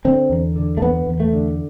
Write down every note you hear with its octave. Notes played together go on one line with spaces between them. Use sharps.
D3 C4
E2
D3
A3
E2 B3
E2
A3
D3